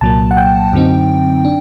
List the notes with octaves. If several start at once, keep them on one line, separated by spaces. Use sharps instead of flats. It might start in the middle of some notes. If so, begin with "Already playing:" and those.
C2 A#2 F#3 A#3 A5
F#5
G5
F#2 D3 F#3 C4 D#4
D4